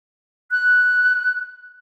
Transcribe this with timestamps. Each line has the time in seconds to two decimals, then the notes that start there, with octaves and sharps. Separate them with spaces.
0.51 F#6